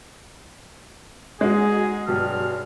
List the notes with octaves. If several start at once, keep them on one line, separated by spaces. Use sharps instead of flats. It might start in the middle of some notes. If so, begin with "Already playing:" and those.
G#3 D#4 F#4 G#4
B1 G2 G4 F6